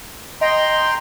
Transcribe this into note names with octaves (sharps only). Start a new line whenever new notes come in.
D#5 G5 A#5 C6